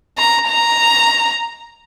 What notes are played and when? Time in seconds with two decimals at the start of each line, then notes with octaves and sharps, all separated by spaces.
0.18 A#5
0.48 A#5